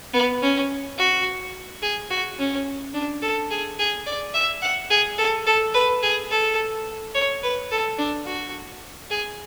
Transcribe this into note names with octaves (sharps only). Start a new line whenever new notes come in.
B3
C#4
F#4
G#4
F#4
C#4
D4
A4
G#4
G#4
D5
E5
F#5
G#4
A4
A4
B4
G#4
A4
C#5
B4
A4
D4
F#4
G#4